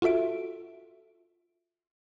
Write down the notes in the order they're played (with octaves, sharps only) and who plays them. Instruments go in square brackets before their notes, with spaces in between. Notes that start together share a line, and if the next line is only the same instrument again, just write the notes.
[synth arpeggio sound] F4 F#4 A4 E5 D7